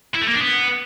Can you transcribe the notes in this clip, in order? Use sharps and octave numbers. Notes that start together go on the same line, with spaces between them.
E4
A3
A#3
D4
B3